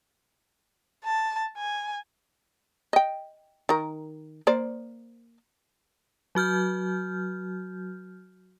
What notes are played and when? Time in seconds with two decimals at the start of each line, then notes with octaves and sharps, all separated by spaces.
1.05 A5
1.58 G#5
2.93 D#5 G5
3.69 D#3 A#4
4.47 A#3 C5 D5
6.35 F#3 F#4 F6 G6